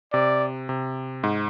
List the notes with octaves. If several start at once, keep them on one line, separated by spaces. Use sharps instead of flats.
C3 D5
C3
G#2